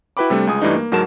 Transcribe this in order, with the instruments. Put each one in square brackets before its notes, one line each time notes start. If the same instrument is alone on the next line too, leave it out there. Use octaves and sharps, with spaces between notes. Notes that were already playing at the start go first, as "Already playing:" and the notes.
[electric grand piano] E4 F#4 B4 G5 B5 D6
C3 G3 A3 D4
C#2 G#3 G#5 D#6
G2 E3 G3 A3 D4 D#4
A#3
D2 G#2 F#3 A#4 A5 E7